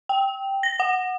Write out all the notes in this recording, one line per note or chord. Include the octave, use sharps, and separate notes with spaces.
G5
A#6
F#5